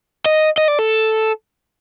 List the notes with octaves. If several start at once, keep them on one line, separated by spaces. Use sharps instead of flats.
D#5
D#5
D5
A4